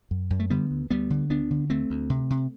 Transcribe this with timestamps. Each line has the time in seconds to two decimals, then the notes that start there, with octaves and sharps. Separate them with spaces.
0.11 F#2
0.30 F#2
0.40 A3
0.50 D3 G3 B3
0.71 D2
0.90 D2 G3 B3
1.10 D3
1.30 D2 B3 D4
1.51 D3
1.70 D2 A3 C4
1.90 D2
2.10 C3
2.30 C3